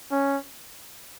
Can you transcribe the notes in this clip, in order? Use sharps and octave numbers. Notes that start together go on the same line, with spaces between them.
C#4